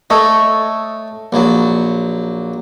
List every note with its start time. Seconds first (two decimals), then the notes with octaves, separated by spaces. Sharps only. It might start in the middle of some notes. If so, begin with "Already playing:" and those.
0.10 A3 A4 C#5 D#5
1.33 A#1 F#3